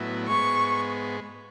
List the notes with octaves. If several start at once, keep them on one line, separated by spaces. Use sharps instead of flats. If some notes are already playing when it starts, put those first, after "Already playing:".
Already playing: A2 F#3 B3 E4
G#2 G#3 B3 C#6